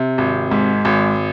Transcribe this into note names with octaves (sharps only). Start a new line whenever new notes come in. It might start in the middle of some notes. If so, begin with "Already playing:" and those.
Already playing: C3
G#1
G#2
G#1